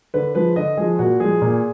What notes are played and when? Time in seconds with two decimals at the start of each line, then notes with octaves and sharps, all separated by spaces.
0.14 D3 B4
0.35 F3 G#3 B4
0.56 D3 D#5
0.77 F3 G#3 G#4
0.99 A#2 F#4
1.20 F3 G#3 G#4
1.42 A#2